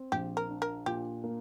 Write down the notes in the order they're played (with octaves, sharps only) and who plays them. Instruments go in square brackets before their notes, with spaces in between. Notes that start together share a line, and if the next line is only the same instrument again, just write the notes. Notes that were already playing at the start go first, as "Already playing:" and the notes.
Already playing: [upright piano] C4
[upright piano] A#1 [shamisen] G4
[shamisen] A#4
[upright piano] D4
[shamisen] A#4
[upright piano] A#2 [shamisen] G4
[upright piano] A#3